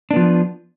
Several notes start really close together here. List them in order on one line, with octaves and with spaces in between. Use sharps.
D4 B3 F3